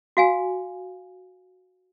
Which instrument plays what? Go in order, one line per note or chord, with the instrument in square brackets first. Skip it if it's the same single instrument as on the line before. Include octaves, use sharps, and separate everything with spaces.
[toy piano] F#4 F5 G#5